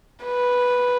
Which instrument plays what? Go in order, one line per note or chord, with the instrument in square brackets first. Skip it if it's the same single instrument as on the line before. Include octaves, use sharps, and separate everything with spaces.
[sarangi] B4